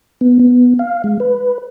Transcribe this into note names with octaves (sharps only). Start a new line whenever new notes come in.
B3
B3
F5
G#3
B4